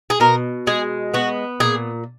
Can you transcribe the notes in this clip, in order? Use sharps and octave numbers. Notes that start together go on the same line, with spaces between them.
G#4
B2 A#4
G#3 G#4
B3 F#4
A#2 G#4